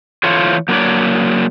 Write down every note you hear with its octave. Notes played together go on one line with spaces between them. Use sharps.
E3 F4 A4 C5 C#5
F#3 A#3 D4 B4 C#5 D5